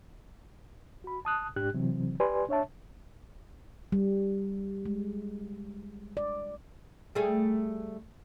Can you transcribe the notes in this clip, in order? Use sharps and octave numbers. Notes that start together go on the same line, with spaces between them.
F#4 B5
A5 D#6 F#6
G#2 D4 G4 F#6
C3 E3 F#3 C4
G4 B4 D5 G#5 C6
D4 C#5 E5 A5
G3
G#3
D5
G3 A3 G#4